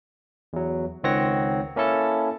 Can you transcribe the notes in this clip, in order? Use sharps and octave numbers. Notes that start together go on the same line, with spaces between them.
E2 F#3
C#2 D#3 C4 C#5 F#5 A#6
A#3 C#4 E4 A4 A5